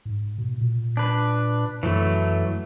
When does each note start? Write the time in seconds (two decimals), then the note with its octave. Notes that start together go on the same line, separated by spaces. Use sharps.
0.05 G#2
0.38 B2
0.58 A#2
0.97 D4 B4
1.83 F#2 E3 F#3 A3